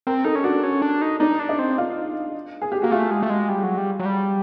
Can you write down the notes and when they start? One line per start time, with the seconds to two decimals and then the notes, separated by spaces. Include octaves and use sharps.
0.07 C4 A#4
0.25 D#4 A4
0.35 C#4
0.44 D4 F#4
0.63 C#4
0.82 D4
1.02 D#4
1.20 D4 D#4
1.39 D4
1.49 D#4
1.59 C4
1.78 F4
2.62 G#4
2.72 G4
2.82 A#3 F#4
2.91 A3 F4
3.11 G#3
3.23 A3
3.30 G#3
3.49 G3
3.63 F#3
3.78 G3
3.99 F#3
4.05 G3